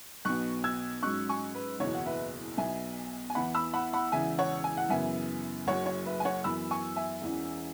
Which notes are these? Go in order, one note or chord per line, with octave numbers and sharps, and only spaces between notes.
B1 B2 B3 C#6 F#6
E6 G#6
G#2 F#3 C#4 C#6 F#6
G#5 C#6
B4
F#1 E2 B2 C#5
F#5
B4 E5
B1 B2 B3 E5 G#5
G#5
E2 E3 B3 E4 F#5 B5
B5 E6
F#5 B5
F#5 B5
E1 E2 C#3 E3 E5 G#5
C#5 F#5
G#5
F#5
F#2 C#3 E3 B3 E5 G#5
F#1 F#2 F#3 C#5 F#5
C#5
B4 E5
G#5
C#5 F#5
F#2 E3 B3 B5 E6
G#5 C#6
E5 G#5
E1 E2 E3 C#4